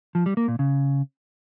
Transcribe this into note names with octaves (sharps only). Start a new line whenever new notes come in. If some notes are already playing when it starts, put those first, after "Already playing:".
F3
G3
A#3
A#2
C#3